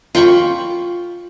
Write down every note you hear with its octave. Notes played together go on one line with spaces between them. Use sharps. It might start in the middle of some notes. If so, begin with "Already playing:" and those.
F4 G5 B5 C#6